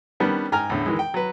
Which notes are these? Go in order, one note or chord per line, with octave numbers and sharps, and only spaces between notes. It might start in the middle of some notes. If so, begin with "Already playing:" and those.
D#3 G3 B3 C#4 D4
G#2 G5 G#5 A#5 F6
E2 A2 D3
D#3 E3 G#3
G5
F#3 B4